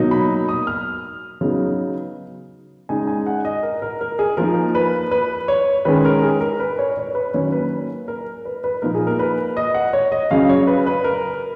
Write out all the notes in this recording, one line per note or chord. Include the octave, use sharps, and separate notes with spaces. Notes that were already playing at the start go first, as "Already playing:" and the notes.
Already playing: B2 F#3 A#3 D#4
B5
D#6
F6
C#3 F#3 B3 D#4
C#3 G#3 D#4 G#5
G#5
F#5
D#5
A#4
A#4
A#4
G#4
F3 A#3 D#4 A#4
B4
B4
C#5
D#3 G#3 C#4 B4
A#4
G#4
A#4
B4
C#5
C#5
B4
D#3 F#3 A#3 C#4 C#5
B4
A#4
B4
B4
A#2 F3 A#3 D#4 A#4
G#4
A#4
B4
D#5
F#5
C#5
D#5
C#3 F#3 C#4 F5
C#5
B4
B4
A#4